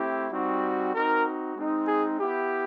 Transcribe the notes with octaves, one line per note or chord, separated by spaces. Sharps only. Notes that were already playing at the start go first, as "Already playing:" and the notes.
Already playing: A3 C4 E4 G4
G3 C4 D#4 F#4
C4 D#4 F#4 A#4
G#3 C4 D#4
G#4
B3 E4 G4